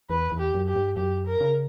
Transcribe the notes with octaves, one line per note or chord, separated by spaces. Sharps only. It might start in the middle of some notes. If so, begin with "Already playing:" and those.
E2 B4
E2
G4
F#2
G4
G2
F#2 G4
A#4
C#3